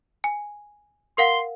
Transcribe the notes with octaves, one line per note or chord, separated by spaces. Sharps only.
G#5
A#4 F5 F#5 C6